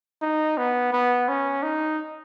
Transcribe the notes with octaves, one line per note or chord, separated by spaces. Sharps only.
D#4
B3
B3
C#4
D#4